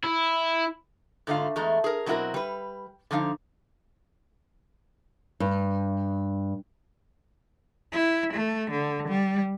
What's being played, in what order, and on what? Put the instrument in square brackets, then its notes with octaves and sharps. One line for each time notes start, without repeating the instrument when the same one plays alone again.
[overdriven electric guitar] E4
[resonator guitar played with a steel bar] G#2 D3 A3 F4 F5
E2 G#3 A3 A#5
G#4 A#4
B2 F#3 C4 E4 F#4 A#4
G3 B4
D3 F3 D#4 F5
[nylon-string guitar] G2
[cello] E4
A3
D3
G3